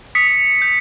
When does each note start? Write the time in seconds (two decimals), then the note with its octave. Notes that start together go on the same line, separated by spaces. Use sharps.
0.15 D#6 B6 C#7
0.62 G6